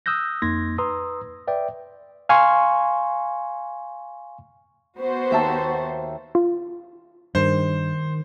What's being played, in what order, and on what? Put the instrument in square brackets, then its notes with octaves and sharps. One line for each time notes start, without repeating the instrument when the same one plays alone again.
[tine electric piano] D#6 E6 F#6 G6 A#6
F2 A#3 D#4 C6 G#6 A#6
B4 A#5 C6 D#6 E6
B4 D5 E5 G5
[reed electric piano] F5 G#5 C6 C#6
[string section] B3 F#4 C5
[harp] D#2 E5 A5
[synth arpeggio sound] F4
[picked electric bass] G2 [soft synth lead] D#3 [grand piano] C5